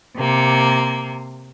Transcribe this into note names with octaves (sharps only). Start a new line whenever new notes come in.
C3 A#3